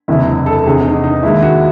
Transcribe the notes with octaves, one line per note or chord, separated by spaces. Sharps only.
F#1 E2 C3 E4
E4
A4
F1 E2 C3 G#4
D#4
D#4
D#2 D#3 G#3 E4
F#4